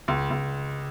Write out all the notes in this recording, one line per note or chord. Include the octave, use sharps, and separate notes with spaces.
C#2
C#2